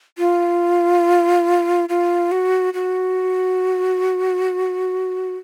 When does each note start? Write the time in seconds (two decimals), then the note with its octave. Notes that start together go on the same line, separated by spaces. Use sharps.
0.18 F4
1.89 F4
2.32 F#4
2.74 F#4